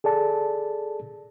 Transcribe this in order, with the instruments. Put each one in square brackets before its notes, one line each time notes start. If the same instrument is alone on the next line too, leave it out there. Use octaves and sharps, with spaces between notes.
[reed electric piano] G#4 A4 D5 A5